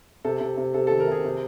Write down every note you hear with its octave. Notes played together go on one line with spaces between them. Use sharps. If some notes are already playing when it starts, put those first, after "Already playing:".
C3 A4
C3
C3
C3 A4
D#3 A4
A#4
C3 G#4
C3